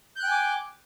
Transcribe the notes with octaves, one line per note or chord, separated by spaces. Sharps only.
G5 G#5 D6 F#6 G6